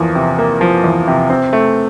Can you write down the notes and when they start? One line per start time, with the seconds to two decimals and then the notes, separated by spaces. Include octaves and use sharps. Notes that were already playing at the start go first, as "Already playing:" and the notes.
Already playing: E2 F3 A#3
0.15 C3
0.39 A#3
0.61 F3
0.84 E2
1.08 C3
1.30 C4
1.53 A3